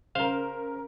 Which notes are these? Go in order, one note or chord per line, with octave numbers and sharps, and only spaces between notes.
C#3 A#4 C5 F5